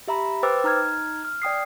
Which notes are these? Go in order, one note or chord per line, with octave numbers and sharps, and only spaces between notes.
G4 E5 A#5 B5
B4 C5 G5 D6 E6 A6
D#4 A#5 F6 G#6
F6
D5 G5 D#6 C7